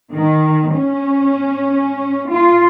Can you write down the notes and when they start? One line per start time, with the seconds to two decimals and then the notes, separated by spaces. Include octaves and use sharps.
0.13 D#3
0.74 C#4
2.30 F4